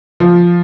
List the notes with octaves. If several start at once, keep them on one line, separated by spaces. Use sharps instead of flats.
F3